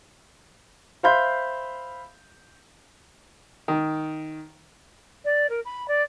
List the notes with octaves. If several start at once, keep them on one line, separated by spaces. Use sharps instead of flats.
C5 E5 F5 B5 C6 G6
D#3
D5
A#4
B5
D5